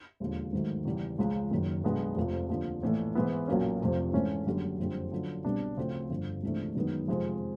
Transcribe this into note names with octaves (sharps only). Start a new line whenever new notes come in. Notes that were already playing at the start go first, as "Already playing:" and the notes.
E1 D#2 D3 F3
G#2 D#3 F#3 A3
E2 C#3 E3 G3
C#2 C#3 F3 G#3
F#1 F#2 D#3
B1 B2 G#3 B3 D4
F1 F2 C3 F3
D#2 D3 F3
A#1 A2 E3 A3
G#2 E3 G#3 B3 E4
B1 A#2 F#3 A#3 C#4
F1 F2 C3 F3
G#2 E3 A3 C#4
F#1 F#2 D3 G3
F#1 F2 D3 G3 C4
F#2 D3 F3
C2 B2 G3 B3 D4
D2 C#3 F3 A3 C4
G1 F2 D3 F3
C#2 C3 E3 A3 D4
F#2 D#3 G#3 B3 D#4
F2 C3 F3 G#3